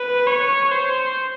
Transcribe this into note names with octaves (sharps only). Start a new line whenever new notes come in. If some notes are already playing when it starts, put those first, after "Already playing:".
Already playing: B4
C#5
C5